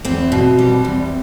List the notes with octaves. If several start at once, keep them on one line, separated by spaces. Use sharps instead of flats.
E2 C4
B2
G3
E2